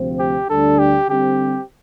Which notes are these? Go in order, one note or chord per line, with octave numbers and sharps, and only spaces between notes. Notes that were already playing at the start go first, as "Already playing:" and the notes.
Already playing: D2 C3 F3 C4
G4
D2 D3 G3 D4 A4
G4
D3 G3 C4 G4